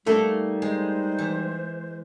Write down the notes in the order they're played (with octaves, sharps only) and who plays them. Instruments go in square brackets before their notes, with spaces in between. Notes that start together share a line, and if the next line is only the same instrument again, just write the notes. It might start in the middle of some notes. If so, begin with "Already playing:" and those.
[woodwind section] G3 D#4 [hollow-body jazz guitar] A3 A4 [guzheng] A#3 A#5
[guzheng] G#3 [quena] C5
[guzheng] E3